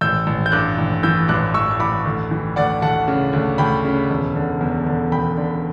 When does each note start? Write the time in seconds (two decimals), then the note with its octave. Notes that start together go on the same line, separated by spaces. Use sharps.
0.01 A1 E6 G6
0.27 A1
0.46 G6
0.52 G2 D6 F#6
0.78 A1
1.03 E3 E6 G6
1.28 A1 D6 F#6
1.54 A1 C#6 E6
1.71 E6
1.80 A1 B5 D6
2.05 D2
2.31 E3
2.56 D2 D5 F#5
2.82 D2 F#5 A5
3.08 C#3
3.33 D2
3.58 D2 G5 B5
3.84 C#3
4.10 E1
4.36 D3
4.61 E2
4.86 D3
5.12 E1 G5 B5
5.37 D3